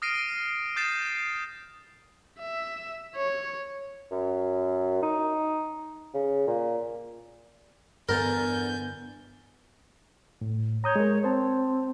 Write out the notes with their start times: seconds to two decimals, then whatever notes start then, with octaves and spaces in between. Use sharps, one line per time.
0.02 D#6 F6 A#6 C7 D7 D#7
0.76 D#6 G6 A6 C7 E7
2.39 E5
3.16 C#5
4.12 F#2
5.02 D#4
6.14 C#3
6.47 A#2
8.09 E2 G2 D3 B3 A#4 G#5 G6 A6
10.41 A2
10.84 C#5 A#5 D#6 G6
10.96 G#3 A#4
11.24 C4 C5 A5